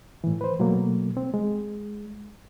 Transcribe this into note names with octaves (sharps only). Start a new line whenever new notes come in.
A2 E3
B4 C5
B2 F#3 A3 A#3
C4
G#3